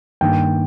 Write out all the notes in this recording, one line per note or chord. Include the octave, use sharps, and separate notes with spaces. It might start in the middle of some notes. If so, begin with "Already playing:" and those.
G2 D#3 A#3 G5